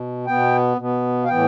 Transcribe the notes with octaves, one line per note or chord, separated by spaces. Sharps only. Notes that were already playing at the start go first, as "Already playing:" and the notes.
Already playing: B2
B2 B3 G5
B2 B3
F5
A2 E3 B3 G5